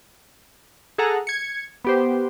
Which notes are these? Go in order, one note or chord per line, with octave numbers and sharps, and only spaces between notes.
G#4 A4 F#5 A#5
G#6 C#7
B3 G4 C5